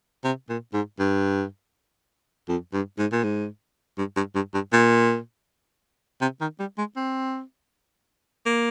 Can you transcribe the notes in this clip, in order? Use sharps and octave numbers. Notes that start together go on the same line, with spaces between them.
C3
A#2
G#2
G2
F2
G2
G#2
A#2
G#2
G2
G2
G2
G2
A#2
C3
D#3
G3
G#3
C4
A#3